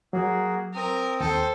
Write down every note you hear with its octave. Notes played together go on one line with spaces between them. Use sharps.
F#3 A#3 F#4 G#4
C4 A#4 D#6
D#2 A4 C5 G5